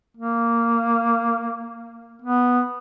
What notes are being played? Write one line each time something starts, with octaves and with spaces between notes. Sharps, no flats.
A#3
B3